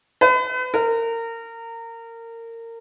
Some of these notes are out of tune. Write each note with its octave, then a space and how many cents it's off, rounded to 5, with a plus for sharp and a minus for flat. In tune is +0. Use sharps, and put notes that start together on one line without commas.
B4 +40
A#4 -25